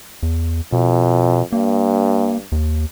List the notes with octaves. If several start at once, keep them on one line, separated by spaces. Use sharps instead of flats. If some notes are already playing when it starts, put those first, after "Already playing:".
E2
F2 B2
G2 A#3
D#2